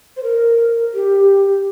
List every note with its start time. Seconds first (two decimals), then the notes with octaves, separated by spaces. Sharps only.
0.17 C5
0.23 A#4
0.94 G4